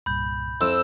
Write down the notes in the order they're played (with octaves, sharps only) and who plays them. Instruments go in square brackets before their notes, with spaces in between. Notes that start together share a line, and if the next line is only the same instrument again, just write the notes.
[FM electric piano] C2 G2 A#2 [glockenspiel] B5 G6
[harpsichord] F2 [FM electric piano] E4 C6 [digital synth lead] E6